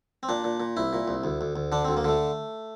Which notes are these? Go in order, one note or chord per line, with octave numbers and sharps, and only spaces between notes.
C4
A#2 D4
A#2
A#2
C2 E4
A#2
C2
D2
D2
D2
D3 D4
C4
D2
A#3
D3 A3